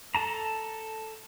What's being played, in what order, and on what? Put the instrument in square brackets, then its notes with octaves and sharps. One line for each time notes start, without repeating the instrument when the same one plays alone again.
[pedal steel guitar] A4 A5 A#5